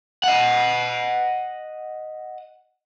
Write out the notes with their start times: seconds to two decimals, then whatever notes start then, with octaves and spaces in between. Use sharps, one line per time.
0.24 D#5 F#5